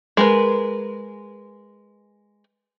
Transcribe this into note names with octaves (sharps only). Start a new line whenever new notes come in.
G#3 A#4 B4